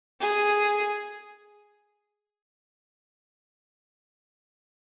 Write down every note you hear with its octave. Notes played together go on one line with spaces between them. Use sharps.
G#4